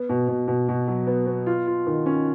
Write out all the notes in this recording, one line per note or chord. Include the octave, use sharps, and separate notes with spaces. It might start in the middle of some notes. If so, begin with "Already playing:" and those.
Already playing: B3
B2
B2
B2
B2
F#3
B3
B3
F4
F4
D#3
C#4